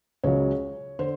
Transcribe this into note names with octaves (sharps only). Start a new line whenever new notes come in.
C#2 C#3 F#3 C#5
D3 C5